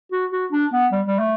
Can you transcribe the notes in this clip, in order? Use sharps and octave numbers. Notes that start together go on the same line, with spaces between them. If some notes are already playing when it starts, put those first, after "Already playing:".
F#4
F#4
D4
B3
G3
G3
A3